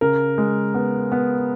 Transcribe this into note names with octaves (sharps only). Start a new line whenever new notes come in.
C#3 A#4
G#3
B3
B3